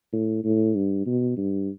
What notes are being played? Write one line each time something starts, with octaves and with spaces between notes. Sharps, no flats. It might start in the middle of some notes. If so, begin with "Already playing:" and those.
A2
A2
G2
B2
G2